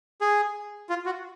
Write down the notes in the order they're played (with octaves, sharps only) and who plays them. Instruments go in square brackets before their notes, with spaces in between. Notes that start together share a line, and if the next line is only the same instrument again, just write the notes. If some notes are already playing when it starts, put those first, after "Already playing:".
[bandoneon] G#4
F4
F#4